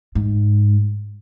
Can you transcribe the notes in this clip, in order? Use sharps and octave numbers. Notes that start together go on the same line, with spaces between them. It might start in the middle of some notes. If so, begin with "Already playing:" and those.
G#2